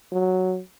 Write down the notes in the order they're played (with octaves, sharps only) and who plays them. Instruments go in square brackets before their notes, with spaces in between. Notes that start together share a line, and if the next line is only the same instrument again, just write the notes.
[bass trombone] F#3